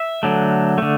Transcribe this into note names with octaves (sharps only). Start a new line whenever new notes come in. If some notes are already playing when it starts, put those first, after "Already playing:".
Already playing: E5
D3 F#3 A3
D3 A3